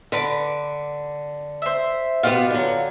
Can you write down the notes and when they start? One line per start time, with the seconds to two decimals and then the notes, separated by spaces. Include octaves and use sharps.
0.12 D3 B4 D6
1.62 C5 E5
2.23 B2 B3 F4 G4
2.51 D3 F#3